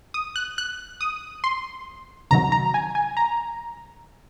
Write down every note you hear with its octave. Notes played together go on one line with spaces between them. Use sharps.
D#6
F#6
F#6
D#6
C6
C#2 C3 D#3 F#3 A#5
A#5
G#5
G#5
A#5